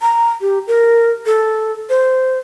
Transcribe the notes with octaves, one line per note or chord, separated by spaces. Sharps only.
A#5
G4
A#4
A4
C5